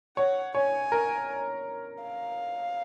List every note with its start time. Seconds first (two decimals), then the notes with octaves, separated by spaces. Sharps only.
0.17 C#5 F#5
0.55 C#5 G#5
0.92 A#4
2.03 F5